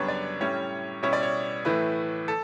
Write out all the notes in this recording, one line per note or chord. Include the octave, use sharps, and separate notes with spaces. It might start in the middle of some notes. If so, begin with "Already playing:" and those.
Already playing: F#2 C#3 G3 B3 D4 B4 C#5
D5
A2 G3 C#4 E4 C#5
B2 G3 C#4 E4 C#5
D5
C#5
A2 E3 A3 E4 B4
A4